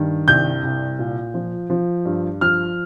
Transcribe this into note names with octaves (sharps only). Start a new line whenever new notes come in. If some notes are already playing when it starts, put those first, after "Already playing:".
Already playing: G2 D#3
C2 G6
C2
A#2
F3
F3
G2
F3 F6